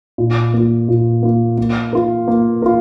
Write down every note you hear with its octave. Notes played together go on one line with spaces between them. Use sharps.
A#2
A#3 F4
A#2
A#3 F4
A#3
F4 A#4
A#3
F4 A#4